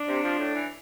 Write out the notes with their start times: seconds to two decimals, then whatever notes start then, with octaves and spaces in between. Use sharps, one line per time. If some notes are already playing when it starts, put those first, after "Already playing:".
Already playing: D4
0.08 C3
0.24 F3
0.39 A2
0.54 E3